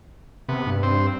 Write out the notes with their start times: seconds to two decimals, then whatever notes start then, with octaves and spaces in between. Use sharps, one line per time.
0.49 C3 B3
0.67 G2
0.83 C4